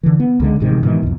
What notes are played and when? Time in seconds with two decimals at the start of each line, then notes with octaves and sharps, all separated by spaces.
0.03 D3 E3
0.20 B3
0.40 C#2 D3 G#3
0.60 A1 G#2 C3 D#3
0.83 G#2 B2 D#3 E3
1.03 B1 F2